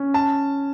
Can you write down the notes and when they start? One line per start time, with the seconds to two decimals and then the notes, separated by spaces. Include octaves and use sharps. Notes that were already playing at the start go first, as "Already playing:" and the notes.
Already playing: C#4
0.14 A5